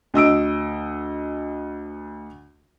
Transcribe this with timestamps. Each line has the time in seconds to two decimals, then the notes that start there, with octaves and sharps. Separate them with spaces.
0.14 D2 D#5 E6 D7